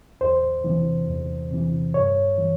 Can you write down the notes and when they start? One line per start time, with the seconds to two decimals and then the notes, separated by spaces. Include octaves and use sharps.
0.21 E2 C5
0.64 C3 E3
1.07 E2
1.51 C3 E3
1.94 G2 C#5
2.38 E3